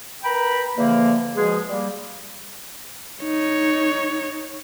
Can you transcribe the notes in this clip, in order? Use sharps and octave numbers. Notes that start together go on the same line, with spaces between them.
A#4 B4 G5 A#5 B5
E2 D3 F3 A#3
B2 F3 G#3 G#4
G3 A#3
D#4 C#5